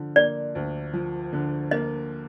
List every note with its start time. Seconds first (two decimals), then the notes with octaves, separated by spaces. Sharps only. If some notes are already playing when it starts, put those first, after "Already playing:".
Already playing: D3 F3
0.16 A#3 D5
0.55 D2
0.93 F3
1.33 D3
1.71 A#3 D#5